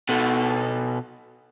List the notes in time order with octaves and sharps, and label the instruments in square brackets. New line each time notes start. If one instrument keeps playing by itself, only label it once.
[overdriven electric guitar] B2 A4